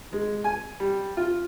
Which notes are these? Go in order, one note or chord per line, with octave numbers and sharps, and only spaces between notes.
G#3
G#5
G3
F4